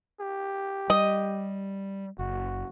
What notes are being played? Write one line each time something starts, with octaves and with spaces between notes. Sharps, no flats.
G4
G3 D#5
F#1 F#4